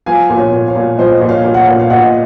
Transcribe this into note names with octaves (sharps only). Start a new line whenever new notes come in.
F3 F5 G#5
A#2
C#5 F5
A#2
C#5 F5
A#2
F3 C5 D#5
A#2
C#5 F5
A#2
F#5
C#5 F5
A#2
F5
A#2 D#5 F#5